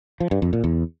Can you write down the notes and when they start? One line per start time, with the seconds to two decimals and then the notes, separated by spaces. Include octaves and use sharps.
0.20 F3
0.31 G2
0.42 F2
0.53 A#2
0.64 E2